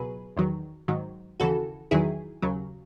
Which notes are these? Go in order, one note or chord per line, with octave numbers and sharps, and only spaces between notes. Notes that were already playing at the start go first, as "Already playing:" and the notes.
Already playing: C#2 B2 F#3 G#4 B4
E2 D#3 F#3
G#2 D#3 F#3
D#2 C#3 E3 F#4 A4
E2 D#3 F#3 E4 G#4
D#2 C#3 F#3